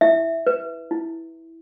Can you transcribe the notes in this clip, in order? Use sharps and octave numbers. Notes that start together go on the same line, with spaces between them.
E4 E5
B4
E4